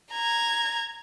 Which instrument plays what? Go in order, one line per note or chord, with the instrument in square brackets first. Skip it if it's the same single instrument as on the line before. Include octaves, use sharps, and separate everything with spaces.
[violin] A#5 G#6